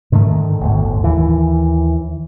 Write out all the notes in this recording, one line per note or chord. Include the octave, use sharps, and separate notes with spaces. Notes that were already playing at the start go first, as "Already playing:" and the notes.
G#2 D3 D#3 A3
G1 D2 A2
D#2 E3